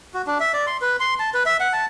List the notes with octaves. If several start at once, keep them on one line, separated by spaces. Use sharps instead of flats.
F#4
D4
E5
D5
C6
B4
C6
A5
B4
E5
F#5
A5